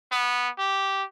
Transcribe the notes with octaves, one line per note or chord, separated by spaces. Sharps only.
B3
G4